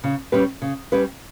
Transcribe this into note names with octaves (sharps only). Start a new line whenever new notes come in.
C#3
G3 C#4 G4 B4
C#3
G3 C#4 G4 B4